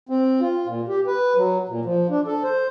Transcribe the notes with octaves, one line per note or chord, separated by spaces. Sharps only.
C4
F4
A#2
G4
B4
F#3
A#2
F3
D4
A4
C5